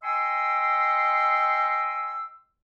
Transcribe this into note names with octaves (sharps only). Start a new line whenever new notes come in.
D#5 G5 G#5 C6 C#6 E6